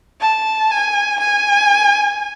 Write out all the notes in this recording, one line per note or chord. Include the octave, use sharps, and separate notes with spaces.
A5
G#5
G#5